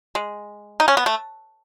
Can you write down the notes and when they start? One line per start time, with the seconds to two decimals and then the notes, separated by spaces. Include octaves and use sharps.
0.15 G#3
0.80 D#4
0.88 C#4
0.97 B3
1.06 A3